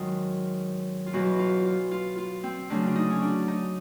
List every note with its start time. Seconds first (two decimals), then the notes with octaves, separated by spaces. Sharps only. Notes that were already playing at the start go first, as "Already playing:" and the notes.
Already playing: G#2 D#3 F#3 F4
1.06 F4
1.13 E2 B2 F#3 F#4
1.39 F4
1.65 F4
1.91 F4
2.18 F4
2.43 C4
2.70 D2 C#3 F#3 D4
2.87 D4
2.95 D#4
3.10 C#4
3.22 D4
3.48 D#4